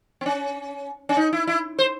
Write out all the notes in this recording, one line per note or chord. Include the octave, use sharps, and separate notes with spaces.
C4
C#4
C#4
D#4
E4
E4
C5